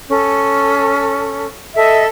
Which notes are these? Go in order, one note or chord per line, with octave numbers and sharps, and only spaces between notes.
C#4 A4
A4 D#5 E5